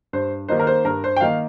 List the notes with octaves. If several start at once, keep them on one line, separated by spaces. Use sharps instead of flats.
G2 C5
D#3 A#3 D#4 C5
A#4
C5
G2 A#4
C5
G5
D#3 A#3 D#4 F5